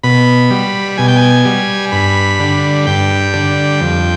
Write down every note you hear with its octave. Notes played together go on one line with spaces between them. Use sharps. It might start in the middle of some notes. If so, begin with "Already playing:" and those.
B2 B5
G3
B2 G#5
G5
G#5
G3
G2 B5
D3 G3
G2 G5
D3 G3
F2